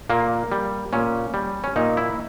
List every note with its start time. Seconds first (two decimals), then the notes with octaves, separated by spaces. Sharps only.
0.10 A#2 A#3
0.52 G3
0.93 A#2 C#4
1.34 G3
1.64 C#4
1.76 A#2 D#4
1.97 E4